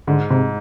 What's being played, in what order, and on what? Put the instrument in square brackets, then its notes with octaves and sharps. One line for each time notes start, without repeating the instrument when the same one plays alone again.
[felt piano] G#2 [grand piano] D3
[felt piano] G#2 [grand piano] C3